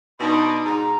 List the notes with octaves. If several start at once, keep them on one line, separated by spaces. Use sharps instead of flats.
B2 D4 D#4 C6
G#2 A#5